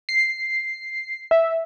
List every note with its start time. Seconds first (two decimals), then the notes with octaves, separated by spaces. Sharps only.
0.09 C7
1.31 E5